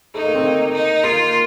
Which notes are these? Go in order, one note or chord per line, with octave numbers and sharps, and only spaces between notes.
A3 D#4
A#3
C4
A#3
D#4
A#3 F4